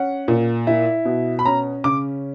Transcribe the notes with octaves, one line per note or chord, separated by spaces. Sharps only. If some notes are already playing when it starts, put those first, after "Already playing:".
Already playing: C#4 F#5
A#2
E4
B2
B5
C#4 A#5
C#3 D6